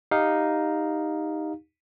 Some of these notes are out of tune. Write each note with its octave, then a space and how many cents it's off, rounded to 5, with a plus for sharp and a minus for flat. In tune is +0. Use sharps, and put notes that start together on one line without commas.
D#4 +0 G4 +5 F5 +5